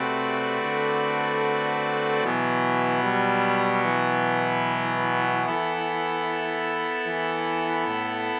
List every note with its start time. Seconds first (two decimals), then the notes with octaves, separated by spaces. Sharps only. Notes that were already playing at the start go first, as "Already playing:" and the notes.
Already playing: C3 A3 C4 F#4 B4 D5
0.62 D3
2.23 B2 E3 F#3 B3
3.03 G3
3.85 E3
5.46 B3 E4 A4
7.07 E3
7.87 A2